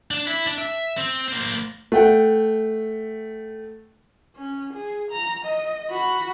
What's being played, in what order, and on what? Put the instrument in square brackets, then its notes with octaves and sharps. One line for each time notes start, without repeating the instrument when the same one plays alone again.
[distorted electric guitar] D4
E4
D4
E5
C4
A#3 C5
[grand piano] A3 F#5 G5
[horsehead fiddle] C#4
G#4
A#5
D#5
F#4 B5